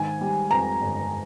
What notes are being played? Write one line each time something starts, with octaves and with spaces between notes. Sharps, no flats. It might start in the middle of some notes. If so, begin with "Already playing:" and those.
Already playing: G#2 D#3 G#5
G3
F2 A#5
G1